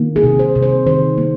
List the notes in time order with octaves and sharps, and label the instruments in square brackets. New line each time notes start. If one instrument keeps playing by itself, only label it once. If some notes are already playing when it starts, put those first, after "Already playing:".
Already playing: [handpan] D#3 A#3
G#4
C3
C5
C3
C5
D#3 C5
A#3